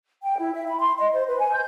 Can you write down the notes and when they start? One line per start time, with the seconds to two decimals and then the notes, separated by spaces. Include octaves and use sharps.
0.23 G5
0.37 E4
0.54 E5
0.67 B5
0.79 C6
0.98 D#5
1.12 C5
1.28 B4
1.40 G#5
1.53 G6